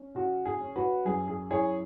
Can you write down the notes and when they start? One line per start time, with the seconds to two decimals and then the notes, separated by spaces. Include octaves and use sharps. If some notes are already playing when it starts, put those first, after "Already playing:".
Already playing: C#4
0.15 C#3 F#4
0.45 G#4
0.61 C#4
0.76 F#4 B4
1.05 F#2 G#4
1.28 G#4
1.50 E4 G#4 C#5